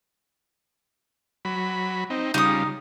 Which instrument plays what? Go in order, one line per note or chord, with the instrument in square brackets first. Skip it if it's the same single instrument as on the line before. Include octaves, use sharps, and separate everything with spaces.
[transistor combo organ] F#3 B5
C4 D#4
[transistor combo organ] C#3 G3 F4 [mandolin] D#4 D#6